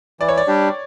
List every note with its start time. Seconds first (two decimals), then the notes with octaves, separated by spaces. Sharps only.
0.20 E3 D5
0.29 C#5
0.37 D5
0.48 G3 D4 G4